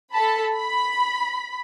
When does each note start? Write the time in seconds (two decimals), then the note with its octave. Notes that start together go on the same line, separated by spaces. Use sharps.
0.12 A4 A5 B5
0.55 B5